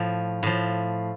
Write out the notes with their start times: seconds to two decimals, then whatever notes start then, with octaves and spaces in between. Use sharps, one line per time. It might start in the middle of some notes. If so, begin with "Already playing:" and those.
Already playing: A2 F3
0.43 A2 F3